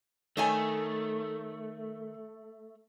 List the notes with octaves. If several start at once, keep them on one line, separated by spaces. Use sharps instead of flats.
D#3 A3 C#5 G#5